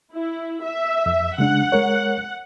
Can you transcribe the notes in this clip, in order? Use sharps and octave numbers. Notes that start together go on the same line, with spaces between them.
E4
E5
F2
C#3 G#3 D4 F#5
G#3 A#4 C#5